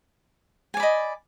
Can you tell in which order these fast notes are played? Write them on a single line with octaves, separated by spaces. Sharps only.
G#5 D5 B5 D#5